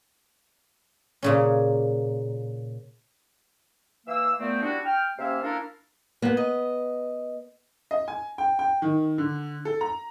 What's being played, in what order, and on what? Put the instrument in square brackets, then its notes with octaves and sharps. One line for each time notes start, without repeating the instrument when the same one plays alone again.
[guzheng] A#2 C#3 C#4
[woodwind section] E3 A#3 F5 E6
A#2 A3 B3 C4
G3 D4 E4 F#4
G5 F6
C3 A#3 C#4 E5 F5
A#3 D4 E4 F4 A4 A#4
[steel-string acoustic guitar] A#3 [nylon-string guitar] B3 B4
[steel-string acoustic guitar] D#5
[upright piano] D#5
G#5
G5
G5
D#3
D3
A4
A#5